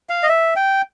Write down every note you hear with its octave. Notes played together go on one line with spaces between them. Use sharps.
F5
D#5
E5
G5